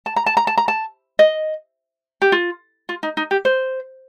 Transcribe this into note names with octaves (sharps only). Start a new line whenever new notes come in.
A5
A#5
A5
A#5
A5
A#5
A5
D#5
G4
F4
F4
D#4
D#4
G4
C5